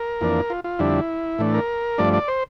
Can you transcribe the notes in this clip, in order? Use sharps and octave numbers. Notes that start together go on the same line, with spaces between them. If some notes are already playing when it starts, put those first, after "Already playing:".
Already playing: A#4
F2 E3 A#3 D4
F4
F4
F2 D3 G3 D4 E4
A2 E3 A3 D4
A#4
G2 F3 A3 D4 D5
D5
C5